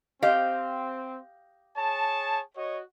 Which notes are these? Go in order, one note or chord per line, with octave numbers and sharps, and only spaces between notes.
C4 G4 D#5 F5
G#4 C#5 A5
F#4 C#5 D#5